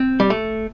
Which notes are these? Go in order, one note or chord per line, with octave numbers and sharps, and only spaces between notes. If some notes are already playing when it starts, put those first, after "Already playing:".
Already playing: C4
G3
A3